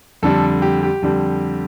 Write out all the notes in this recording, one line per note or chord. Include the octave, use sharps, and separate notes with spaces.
F2 D3 G3 A4
G4
G4
F2 D3 G3